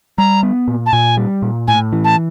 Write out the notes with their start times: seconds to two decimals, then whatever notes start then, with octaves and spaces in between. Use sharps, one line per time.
0.18 G3 A#5
0.43 B3
0.68 A#2
0.86 A5
0.93 A#2 G#5
1.17 G3
1.42 A#2
1.68 A2 G#5
1.93 E3
2.04 A5